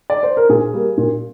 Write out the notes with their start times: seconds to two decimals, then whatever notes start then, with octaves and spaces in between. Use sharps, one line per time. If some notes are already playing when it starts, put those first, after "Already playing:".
0.10 D5
0.23 C5
0.37 A#4
0.49 A#2 G#4
0.74 G3 A#3
0.98 A#2